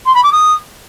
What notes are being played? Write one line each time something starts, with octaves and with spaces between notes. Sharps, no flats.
C6
B5
D6
D#6